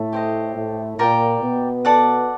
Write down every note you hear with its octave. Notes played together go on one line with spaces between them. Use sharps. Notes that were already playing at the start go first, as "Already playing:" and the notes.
Already playing: A2 A3
G4 C5 D#5
A2 A3
A#2 A#3 G4 A#4 D5 G5
B2 B3
A4 D5 F#5